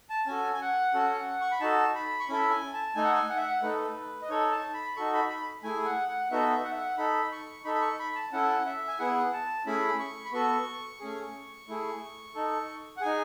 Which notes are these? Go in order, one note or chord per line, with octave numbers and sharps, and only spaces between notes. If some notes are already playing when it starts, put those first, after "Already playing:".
A5
C#4 F#4 A4 G#5
G#5
F#5
C#4 F#4 A4
C#6
B5
D#4 F#4 A4 A5
B5
C#6
C#4 E4 A4 B5
G#5
A5
A3 D#4 A4 G#5
F#5
G#5
F#5
E5
F#5
A3 D#4 A4 B4
D#5
D#4 A4 C#5
A5
B5
D#4 F#4 A4 C#6
B5
B5
A3 E4 G#4 G#5
G#5
F#5
F#5
B3 D#4 F#4 A4 E5
F#5
E5
F#5
D#4 A4 B5
C#6
D#4 A4 B5
B5
C#6
B5
A5
C#4 E4 A4 F#5
E5
G#5
B3 E4 G#4 F#5
A5
A3 C#4 E4 G#4 B5
C#6
B5
B3 F#4 A4 C#6
A3 C#4 G#4
A3 E4 G#4
D#4 A4
F#5
D#4 G#4 G#5